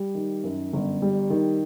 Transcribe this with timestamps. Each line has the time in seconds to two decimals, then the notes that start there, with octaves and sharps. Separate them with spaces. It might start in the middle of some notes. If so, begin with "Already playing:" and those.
Already playing: G3
0.15 D#3
0.44 F#2
0.73 G1
1.02 G3
1.30 D#3